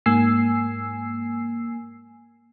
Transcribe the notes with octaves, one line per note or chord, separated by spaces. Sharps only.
G#2 A#3 G#5 E6 C7